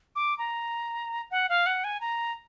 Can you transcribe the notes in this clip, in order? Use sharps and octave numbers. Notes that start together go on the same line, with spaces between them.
D6
A#5
F#5
F5
F#5
G#5
A#5